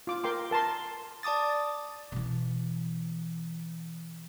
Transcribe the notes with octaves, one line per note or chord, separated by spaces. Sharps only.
F4 D6
A#4 G5 C6 D6
A#4 A5 A#5 C6
D5 A5 D6 D#6 A6
B2 E3